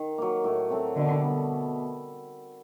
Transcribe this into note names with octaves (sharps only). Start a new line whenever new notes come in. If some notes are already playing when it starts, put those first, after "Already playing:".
Already playing: D#3
F#3 A#3
A2
F#3 A3 C4
B2 D3
G3 B3